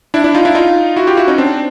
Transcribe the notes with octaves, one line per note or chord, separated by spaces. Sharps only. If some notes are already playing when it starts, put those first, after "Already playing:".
D4 E4
D4 E4
D#4 F4
D4 E4
D#4 F4
E4 F#4
F4 G4
E4 F#4
C#4 D#4
C4 D4